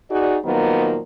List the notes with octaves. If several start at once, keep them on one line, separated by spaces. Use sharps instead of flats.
D#4 F#4 G#4 D5
A#2 D#3 F3 F#3 A#3 B3